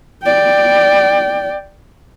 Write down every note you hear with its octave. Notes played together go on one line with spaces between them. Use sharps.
D5 G5